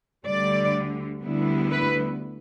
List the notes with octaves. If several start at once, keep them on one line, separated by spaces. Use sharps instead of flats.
D2 D3 G3 D5
D2 D3 G3 B3 E4
B4